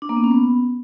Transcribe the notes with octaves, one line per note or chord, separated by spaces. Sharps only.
D4
A#3
B3
C#4
B3